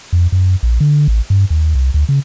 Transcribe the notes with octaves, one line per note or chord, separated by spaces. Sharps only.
F2
F#2
A#1
D3
A1
G2
D#2
C2
D2
C#3